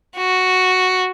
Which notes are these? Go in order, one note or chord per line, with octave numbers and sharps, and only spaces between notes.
F#4